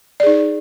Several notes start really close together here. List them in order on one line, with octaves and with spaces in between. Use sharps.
D5 G#4 D#4